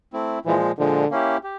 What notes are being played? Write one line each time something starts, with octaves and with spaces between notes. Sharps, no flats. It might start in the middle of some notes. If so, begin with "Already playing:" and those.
A3 C4 E4
A#2 E3 F3 G#3
A#2 D3 F3 G#3
A#3 C#4 E4 G4
G4